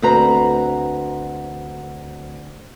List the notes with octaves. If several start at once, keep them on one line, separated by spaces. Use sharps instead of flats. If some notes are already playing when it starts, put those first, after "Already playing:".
D2 C4 F#4 B4 A#5